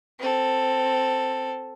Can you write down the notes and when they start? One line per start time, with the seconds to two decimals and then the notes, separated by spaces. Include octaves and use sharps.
0.19 C4 A4